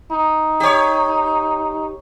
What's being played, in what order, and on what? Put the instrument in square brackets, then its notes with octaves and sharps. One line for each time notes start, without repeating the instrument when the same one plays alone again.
[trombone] D#4
[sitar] G4 C#5